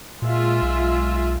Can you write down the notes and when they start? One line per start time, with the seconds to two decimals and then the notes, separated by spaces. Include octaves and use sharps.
0.22 A#2 G#3 F4 E5
0.62 B1